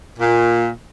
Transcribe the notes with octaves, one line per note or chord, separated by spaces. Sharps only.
A#2